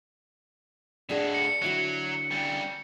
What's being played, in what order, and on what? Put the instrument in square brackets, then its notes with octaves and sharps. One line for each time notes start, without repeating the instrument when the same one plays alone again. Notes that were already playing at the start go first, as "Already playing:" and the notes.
[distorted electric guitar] A2 F#4 [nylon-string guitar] D4 G#4
[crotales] C#7
[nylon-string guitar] D3 E4 F#4 [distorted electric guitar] F#3 [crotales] C#7
[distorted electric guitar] C#3 G3